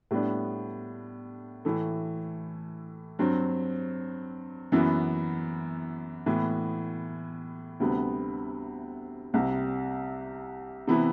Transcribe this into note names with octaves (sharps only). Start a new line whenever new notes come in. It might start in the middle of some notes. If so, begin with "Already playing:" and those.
A2 G3 B3 D4
A2 E3 A3
G2 F#3 C4
F#2 E3 B3
A2 E3 B3
D2 C3 G3 B3
C2 C3 G3
C3 E3 B3 E4